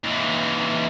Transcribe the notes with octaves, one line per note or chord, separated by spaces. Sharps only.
D#2 E3